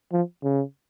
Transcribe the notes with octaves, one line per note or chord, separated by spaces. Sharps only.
F3
C#3